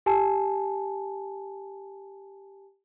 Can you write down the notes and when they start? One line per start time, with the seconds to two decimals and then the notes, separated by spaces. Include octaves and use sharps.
0.06 G4 G#5 A5